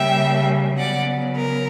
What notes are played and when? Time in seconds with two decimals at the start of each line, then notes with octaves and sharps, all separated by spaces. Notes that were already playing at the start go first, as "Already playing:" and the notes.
Already playing: C#3 G3 A#3 E5 G5
0.78 C#3 F#3 B3 D5 F#5
1.37 A#4